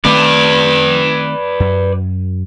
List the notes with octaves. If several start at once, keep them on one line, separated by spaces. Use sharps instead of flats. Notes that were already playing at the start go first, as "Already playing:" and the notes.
D#3 A3 C4 B4 D5
F#2